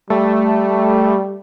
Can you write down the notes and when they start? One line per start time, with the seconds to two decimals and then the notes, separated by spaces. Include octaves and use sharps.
0.10 G3 A3